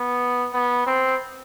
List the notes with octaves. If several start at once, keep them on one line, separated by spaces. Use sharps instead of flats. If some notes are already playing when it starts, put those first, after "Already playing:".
Already playing: B3
B3
C4